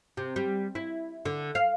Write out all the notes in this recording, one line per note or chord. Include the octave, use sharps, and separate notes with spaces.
C3
G3
E4
D3
F5